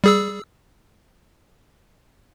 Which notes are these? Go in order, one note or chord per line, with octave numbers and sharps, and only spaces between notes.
G3 G#4 E6